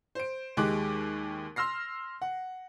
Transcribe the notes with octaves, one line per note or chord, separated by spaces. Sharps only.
C5 D7
D#2 G#3 G4 D6 F#6
C6 E6 F6 A#6 C7
F#5